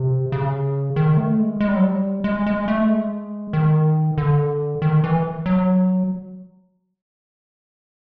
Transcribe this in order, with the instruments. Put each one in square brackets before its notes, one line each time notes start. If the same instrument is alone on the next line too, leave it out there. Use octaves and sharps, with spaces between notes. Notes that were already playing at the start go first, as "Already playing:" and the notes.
Already playing: [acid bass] C3
C#3
D#3
A3
G#3
G#3
G3
F#3
G3
G#3
G#3
A3
G#3
D#3
D3
D#3
E3
F#3